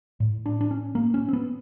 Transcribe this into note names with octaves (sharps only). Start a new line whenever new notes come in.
A2
D4
D4
C#4
A#3
C#4
C4
B3